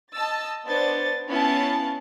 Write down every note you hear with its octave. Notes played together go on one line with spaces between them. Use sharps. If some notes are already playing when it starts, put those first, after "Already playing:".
D#5 A5 E6 A6
B3 D4 C5 A6
B3 C#4 E4 F5 A5